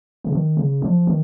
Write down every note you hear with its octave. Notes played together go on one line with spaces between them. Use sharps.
C#3
D#3
C#3
F3
D#3